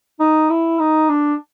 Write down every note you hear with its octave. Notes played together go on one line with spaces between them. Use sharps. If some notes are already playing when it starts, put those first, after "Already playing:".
D#4
E4
D#4
D4